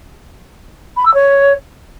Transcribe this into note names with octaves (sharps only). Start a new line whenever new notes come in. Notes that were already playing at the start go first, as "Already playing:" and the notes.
B5
E6
C#5